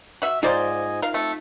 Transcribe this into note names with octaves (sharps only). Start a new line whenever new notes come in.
F#4 E5
G#2 A#3 D#4 F4 C5 D5 D#5 G#5
A#4 F5
A3 C4